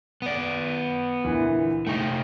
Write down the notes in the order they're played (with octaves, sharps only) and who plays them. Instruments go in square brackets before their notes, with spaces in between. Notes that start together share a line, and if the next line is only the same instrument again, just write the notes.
[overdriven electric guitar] B3 D5
[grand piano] D2 A#2 E3
[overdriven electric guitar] A3 D#4 [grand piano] G5 C#6